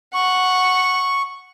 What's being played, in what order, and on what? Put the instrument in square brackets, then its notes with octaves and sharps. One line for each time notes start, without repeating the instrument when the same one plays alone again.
[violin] F#5 [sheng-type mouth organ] C#6